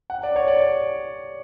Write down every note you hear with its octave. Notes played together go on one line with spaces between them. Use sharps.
F#5
D5
C#5
D5